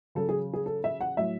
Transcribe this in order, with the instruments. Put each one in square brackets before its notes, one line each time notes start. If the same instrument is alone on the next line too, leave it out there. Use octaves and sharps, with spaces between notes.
[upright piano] C#3 F#3 A4
G#4
G#4
A4
E5
F#5
A2 F#3 E5